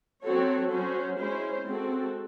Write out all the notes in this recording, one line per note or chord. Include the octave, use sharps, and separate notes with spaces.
F#3 C4 F#4 A4 C#5
F#3 C#4 F#4 C5
G#3 C#4 E4 C5
G#3 C4 F#4 A4